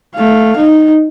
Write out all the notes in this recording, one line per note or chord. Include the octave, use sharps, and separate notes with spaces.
A3 F5
D#4